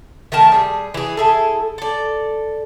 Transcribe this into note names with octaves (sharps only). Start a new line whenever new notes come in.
D#3 A3 A#4 A5
G3 G#4
E3 G#4
E4 G#4 A4
A4 D5